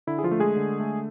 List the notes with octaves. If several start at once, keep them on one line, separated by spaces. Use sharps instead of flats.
D3 E4
G#4
F3 F4
A3
G#3 G#4
D3
A3